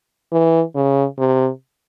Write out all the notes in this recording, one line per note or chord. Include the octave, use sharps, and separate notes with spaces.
E3
C#3
C3